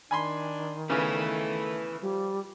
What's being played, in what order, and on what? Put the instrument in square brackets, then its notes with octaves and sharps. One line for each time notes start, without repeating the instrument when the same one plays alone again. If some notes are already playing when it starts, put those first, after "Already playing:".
[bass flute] D#3 [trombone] D4 [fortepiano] G#5 B5 C6
[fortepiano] C#3 B3 C#4 [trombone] A3 [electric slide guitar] E4 B4
[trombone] F3 [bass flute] G3